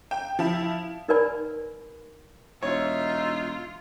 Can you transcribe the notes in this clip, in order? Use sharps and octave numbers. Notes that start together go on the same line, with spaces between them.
G5
F3 E4
D#4 A#4 B4 D5 G#5 B5
E1 D#4 F4 C#5 E5